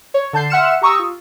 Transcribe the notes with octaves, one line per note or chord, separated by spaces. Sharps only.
C#5
D3 A5 G6 C7
E5 F#5 C6 F6 C#7 E7
G4 A#5 C#6 D#6 E6
F4